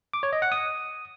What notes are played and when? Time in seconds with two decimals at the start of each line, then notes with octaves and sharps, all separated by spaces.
0.13 D6
0.23 C#5
0.33 D#5
0.42 F#5
0.52 D#6